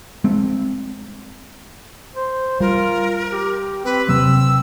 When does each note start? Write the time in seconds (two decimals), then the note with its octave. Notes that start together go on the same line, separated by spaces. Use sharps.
0.24 G#3 C4
2.16 C5
2.60 G3 F4 A#4
3.32 G4
3.85 C4 B4
4.09 C3 F#3 A#3 E6